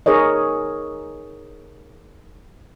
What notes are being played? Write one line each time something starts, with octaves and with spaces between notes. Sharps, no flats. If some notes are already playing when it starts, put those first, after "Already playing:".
D#4 G#4 A#4 C#5 D#5